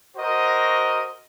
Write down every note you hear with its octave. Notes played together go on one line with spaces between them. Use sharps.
F#4 A#4 C5 D#5